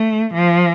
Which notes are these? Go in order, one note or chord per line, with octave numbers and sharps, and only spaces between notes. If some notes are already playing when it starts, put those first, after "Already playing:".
Already playing: A3
F3